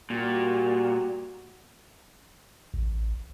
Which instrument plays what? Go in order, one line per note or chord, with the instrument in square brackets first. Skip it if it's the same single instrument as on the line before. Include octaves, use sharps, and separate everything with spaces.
[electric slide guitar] A#2 [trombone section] G3 F#4 G4
[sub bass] A1